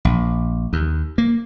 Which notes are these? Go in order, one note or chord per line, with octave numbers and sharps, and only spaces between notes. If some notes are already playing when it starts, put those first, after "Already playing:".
A#1
D#2
A#3